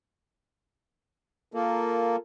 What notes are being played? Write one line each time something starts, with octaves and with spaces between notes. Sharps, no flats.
A#3 F4 A4 A#4